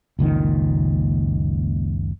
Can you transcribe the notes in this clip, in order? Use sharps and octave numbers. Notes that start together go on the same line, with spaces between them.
F#1 C#2 A#2 D#3